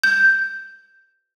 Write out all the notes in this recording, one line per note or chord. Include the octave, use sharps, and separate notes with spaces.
G6